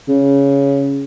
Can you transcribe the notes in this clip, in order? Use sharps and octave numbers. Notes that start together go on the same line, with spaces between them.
C#3